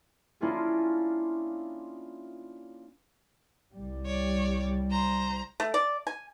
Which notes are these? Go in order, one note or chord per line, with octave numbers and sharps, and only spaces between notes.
A#3 C#4 D4 E4 F4 G#4
C2 G3
C#5 D5
C5 A#5
A3
D5
G#5